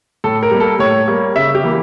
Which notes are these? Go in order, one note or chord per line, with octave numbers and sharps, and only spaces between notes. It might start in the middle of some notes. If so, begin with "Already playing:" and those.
A2 A4
A#4
G3 A#3
A4
A2 C#5
G3 A#3
C#3 E5
G4
E3 A#3